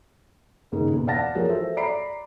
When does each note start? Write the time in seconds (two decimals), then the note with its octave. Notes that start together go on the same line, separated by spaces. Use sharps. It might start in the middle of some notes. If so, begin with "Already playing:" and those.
0.72 D#2 G#2 C#3 G#3 A3 D#4
0.93 E2 B2
1.07 D5 F5 F#5 A5 A6 A#6
1.35 E3 F3 G#4 A#4 C#5
1.49 F#4 A4 C5 E5
1.77 D5 A#5 B5 C7 D7